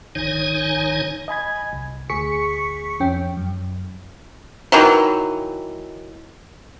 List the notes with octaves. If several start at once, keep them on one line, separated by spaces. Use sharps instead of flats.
A#1 G#2 D#3 D#4 C#5 G#5
D#5 G#5 B5 G#6
C2
D2 G#4 C#6 B6 C#7
F2 C#4 G5
F#2
D#3 E3 F#3